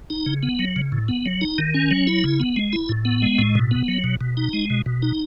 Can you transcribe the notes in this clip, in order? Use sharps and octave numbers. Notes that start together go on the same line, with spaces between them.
D#4
C#3
B3
F#3
C#3
A2
B3
F#3
D#4
D#3
C#4
F#3
E4
C#3
B3
G#3
E4
A2
B3
G#3
A2
B2
B3
F#3
B2
B2
D#4
G#3
B2
B2
D#4